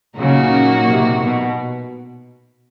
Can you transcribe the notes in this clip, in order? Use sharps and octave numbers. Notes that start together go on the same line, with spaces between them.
A#2 C#3 F#3 A#3 D#4 F#4
C3
B2